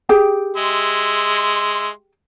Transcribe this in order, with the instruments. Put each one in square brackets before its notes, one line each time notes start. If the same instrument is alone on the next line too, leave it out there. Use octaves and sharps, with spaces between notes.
[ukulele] G4 G#4 G5
[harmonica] G#3 E5 C6